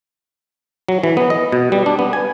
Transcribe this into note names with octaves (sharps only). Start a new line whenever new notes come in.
F#3
E3
B3
D#5
B2
G3
D4
B3
G#5